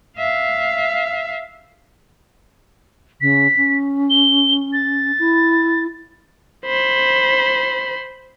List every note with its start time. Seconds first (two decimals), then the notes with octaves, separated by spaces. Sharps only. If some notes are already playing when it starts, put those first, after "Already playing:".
0.17 E5 F5
3.21 C#3 B6
3.56 C#4
4.10 G7
4.73 A6
5.19 E4
6.66 C5 B5